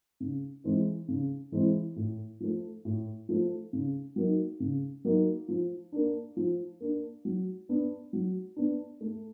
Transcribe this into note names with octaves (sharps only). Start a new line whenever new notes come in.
C#3
E3 G#3 C4 E4
C#3
E3 G#3 C4 E4
A2
F3 A3
A2
F3 A3
C#3
F#3 A#3 D#4
C#3
F#3 A#3 D#4
F3
A#3 D4
F3
A#3 D4
F#3
B3 D4
F#3
B3 D4
A3